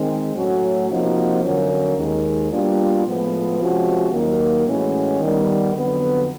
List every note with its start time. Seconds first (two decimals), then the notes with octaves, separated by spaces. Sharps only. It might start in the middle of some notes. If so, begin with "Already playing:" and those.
Already playing: D#3 G#3 C4
0.35 A2 F#3 A3 C#4 F#4
0.90 C3 F3 A#3 D#4 F#4
1.43 F2 D3 F#3 A#3 C#4
1.97 D#2 D#3 G#3
2.51 B2 G3 A#3 D4 F4
3.05 A2 F3 G#3 B3
3.59 C3 F3 G#3 C#4 F#4
4.12 D#2 D#3 F#3 A#3
4.66 A2 E3 G#3 C#4 F#4
5.20 D#3 G3 B3
5.74 F2 D3 F#3 B3